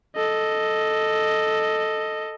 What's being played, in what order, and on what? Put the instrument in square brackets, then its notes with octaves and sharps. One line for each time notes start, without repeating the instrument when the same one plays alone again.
[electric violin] A4 D#5